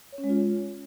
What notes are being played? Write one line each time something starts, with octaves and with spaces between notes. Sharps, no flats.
C#5
C#4
G#3
F4